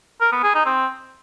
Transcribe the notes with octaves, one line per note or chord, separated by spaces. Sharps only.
A#4
B3
G#4
D#4
C4